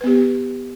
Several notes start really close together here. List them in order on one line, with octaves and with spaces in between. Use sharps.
B4 B3 G4